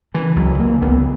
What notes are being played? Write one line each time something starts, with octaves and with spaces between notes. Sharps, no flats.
C#3 E3
C#2 F#3
C#3 A#3
C#2 B3